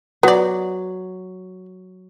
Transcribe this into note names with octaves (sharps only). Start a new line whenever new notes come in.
F#3 B3 D5